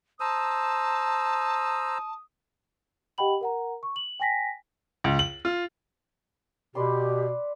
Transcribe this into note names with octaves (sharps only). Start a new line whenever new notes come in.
C5 A5 A#5 D#6 E6
G4 D#5 F#5 G5 B5 F#7
A#4 F#5 A#5
C#6
F#7
G5 G#5 A#6 B6
C#2
F#7
F4
B2 G4 B4 D5 C6